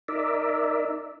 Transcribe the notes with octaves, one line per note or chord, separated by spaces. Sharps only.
D#4 A#4 D5 E5